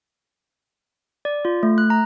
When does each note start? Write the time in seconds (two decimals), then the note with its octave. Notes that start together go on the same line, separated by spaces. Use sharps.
1.25 D5
1.45 F4
1.63 A3
1.78 F#6
1.90 A#5